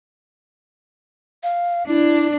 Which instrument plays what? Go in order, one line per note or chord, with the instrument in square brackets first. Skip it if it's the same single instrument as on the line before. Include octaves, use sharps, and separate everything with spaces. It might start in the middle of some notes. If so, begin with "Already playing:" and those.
[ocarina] F5
[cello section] D4 [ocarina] E4